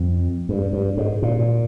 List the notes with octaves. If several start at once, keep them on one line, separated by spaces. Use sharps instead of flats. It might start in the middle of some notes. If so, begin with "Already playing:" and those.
Already playing: F2
G2
G2
G#2
A#2